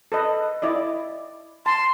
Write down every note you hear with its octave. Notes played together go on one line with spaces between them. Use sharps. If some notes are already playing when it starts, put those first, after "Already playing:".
A4 B4 D#5
E4 D5 D#5
A5 C6